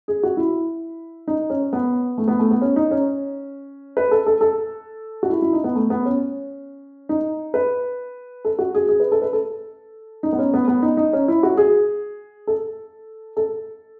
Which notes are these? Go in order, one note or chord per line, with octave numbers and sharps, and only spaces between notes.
G#4
F#4
E4
D#4
C#4
B3
A3
B3
A3
B3
C#4
D#4
C#4
B4
A4
A4
A4
F#4
E4
E4
D#4
B3
A3
B3
C#4
D#4
B4
A4
F#4
G#4
G#4
B4
A4
B4
A4
D#4
B3
C#4
B3
B3
D#4
D#4
C#4
E4
F#4
G#4
A4
A4